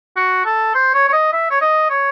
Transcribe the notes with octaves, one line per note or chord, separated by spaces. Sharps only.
F#4
A4
C5
C#5
C#5
D#5
E5
C#5
D#5
C#5